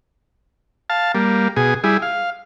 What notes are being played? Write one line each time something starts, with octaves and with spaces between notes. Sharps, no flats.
F5 A5
G3 A#3
B2 G#4
G3 E4 G#4
F5